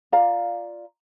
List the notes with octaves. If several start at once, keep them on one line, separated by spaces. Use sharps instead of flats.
F4 D5 F5 A#5